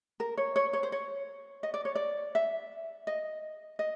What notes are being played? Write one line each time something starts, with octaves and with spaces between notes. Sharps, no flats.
A#4
C#5
C#5
C#5
C5
C#5
D#5
D5
C#5
D5
E5
D#5
D#5